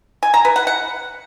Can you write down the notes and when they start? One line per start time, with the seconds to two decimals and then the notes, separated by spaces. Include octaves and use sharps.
0.23 G#5
0.34 A#5
0.45 B4
0.56 F#5
0.67 F#5